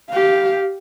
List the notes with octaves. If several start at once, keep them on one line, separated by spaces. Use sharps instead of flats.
G4 F5